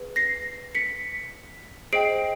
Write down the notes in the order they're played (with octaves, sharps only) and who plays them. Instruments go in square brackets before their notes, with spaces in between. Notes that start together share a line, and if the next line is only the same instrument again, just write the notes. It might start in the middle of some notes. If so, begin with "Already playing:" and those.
Already playing: [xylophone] G#4 B4
A#6 C7
B6 C#7
G#4 C5 D#5 G5 C7 D7